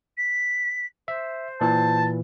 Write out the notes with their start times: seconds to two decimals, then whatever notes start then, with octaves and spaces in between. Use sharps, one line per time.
0.18 B6
1.08 C5 E5
1.61 A#2 E3 A5